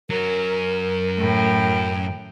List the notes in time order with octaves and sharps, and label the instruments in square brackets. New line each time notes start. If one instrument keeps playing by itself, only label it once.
[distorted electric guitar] F#2 F#3 [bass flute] A#4
[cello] A2 G5